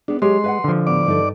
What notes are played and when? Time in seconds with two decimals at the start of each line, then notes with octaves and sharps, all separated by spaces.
0.08 B3 D4 G#4
0.22 F#3 G#3 G4 C#5 C6
0.44 B4 E5 F#5
0.64 D3 F3
0.87 D#2 A2 B3 D5 D6
1.06 G2 D#4 A4